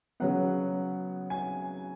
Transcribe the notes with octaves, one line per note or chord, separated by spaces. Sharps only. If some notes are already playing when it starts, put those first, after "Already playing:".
C#3 F#3 B3 F#5
G#5